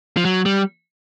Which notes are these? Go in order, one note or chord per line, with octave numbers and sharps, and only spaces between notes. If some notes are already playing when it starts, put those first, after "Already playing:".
F3
F#3
G3